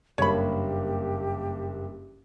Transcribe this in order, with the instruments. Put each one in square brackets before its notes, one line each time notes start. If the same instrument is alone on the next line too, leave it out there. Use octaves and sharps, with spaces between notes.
[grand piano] F#1 G2 A#3 [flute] G4 [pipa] C#5 B5